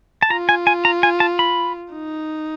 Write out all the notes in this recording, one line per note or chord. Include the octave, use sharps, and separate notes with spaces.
A5
F4 A#5
G#5
G#5
A#5
G#5
A5
B5
D#4